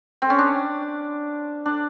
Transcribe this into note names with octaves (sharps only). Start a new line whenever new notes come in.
C4
C#4
D4
D4